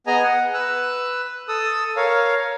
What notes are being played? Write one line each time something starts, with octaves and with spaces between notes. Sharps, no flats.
B3 G#4 D#5 G#5 A#5
F#5
B4 E6 F#6
A4 D#6 E6
A#4 C#5 F5